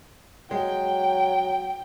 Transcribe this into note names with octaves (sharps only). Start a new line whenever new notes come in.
F#3 G#3 G5